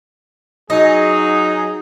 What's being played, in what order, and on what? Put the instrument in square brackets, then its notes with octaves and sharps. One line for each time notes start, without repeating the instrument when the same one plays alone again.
[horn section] F#3 D#4 G#4 [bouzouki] D#5